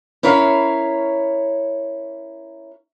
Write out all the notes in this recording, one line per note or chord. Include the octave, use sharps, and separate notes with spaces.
C#4 E4 A#4 C#5 F5